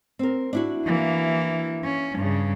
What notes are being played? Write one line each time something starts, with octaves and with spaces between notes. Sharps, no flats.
C4 A#4
D4 E4 F#4
E3 A#3
C#4
G2 C#3